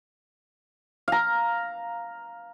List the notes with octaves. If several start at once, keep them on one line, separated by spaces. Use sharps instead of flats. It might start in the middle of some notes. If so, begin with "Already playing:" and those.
F5 A#5